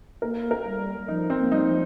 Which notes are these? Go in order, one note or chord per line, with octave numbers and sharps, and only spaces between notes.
A#3 A#4
A#4
G3
F3 D#4
C4
A#3
G3 D#4
F3